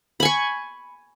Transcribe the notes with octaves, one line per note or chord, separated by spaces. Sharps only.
G#5 B5 C#6